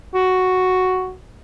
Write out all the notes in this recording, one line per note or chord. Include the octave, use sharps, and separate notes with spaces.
F#4